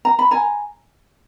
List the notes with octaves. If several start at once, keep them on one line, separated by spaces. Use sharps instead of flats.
A#5
B5
G#5 A#5